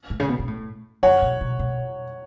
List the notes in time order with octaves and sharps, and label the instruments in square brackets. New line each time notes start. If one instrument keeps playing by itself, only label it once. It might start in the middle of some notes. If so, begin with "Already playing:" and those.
[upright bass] A2
C#3
B2
B2
A2
[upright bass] F#2 [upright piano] C#5 F#5
[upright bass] B2
B2
B2